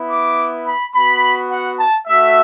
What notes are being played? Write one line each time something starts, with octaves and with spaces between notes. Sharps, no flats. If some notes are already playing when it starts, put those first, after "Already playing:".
Already playing: B3 E4
D6
B5
B3 F#4 B5
F#5
A5
A3 F#4 E5